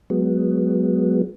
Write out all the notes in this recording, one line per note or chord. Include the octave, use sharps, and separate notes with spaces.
F#3 G#3 B3